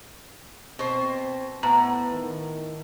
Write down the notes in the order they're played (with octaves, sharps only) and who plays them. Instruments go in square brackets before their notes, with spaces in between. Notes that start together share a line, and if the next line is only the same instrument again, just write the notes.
[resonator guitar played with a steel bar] B2 C5 [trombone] C4
[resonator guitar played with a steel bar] A2 [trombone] B3 [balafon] A#5
[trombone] D#3